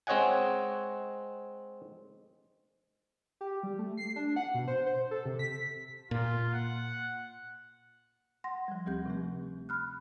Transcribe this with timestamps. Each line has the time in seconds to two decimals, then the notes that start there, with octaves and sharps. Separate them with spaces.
0.07 G#3 C4 C#5 D#5 F#5 G#5
3.41 G4
3.63 G3
3.79 A3
3.98 C7
4.16 D4
4.36 F#5
4.54 B2
4.68 C5
4.86 C5
5.11 A4
5.25 C3
5.39 B6
6.11 A#2 F4
6.54 F#5
8.44 F#5 C6 A#6
8.68 F3 G3
8.86 D2 G3 C4 G4 G6
9.06 C3 F3 A3
9.69 B5 F6 F#6